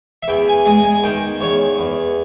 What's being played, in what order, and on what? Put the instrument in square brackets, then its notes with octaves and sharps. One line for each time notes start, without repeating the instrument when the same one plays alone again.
[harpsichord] E5
E2 G5
G#5
G#3 G#5
G#5
D#3 G5
E2 C#5
E2